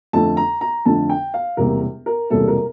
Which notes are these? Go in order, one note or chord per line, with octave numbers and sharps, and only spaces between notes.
F2 D3 A3 A5
A#5
A#5
F2 D3 A3 A5
G5
F5
E1 E2 C3 G3 A#3 A#4
A#4
E1 E2 C3 G3 A#3 A4
A#4